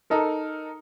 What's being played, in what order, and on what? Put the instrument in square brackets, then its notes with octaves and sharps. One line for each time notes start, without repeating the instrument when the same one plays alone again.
[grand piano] D#4 A4 A#4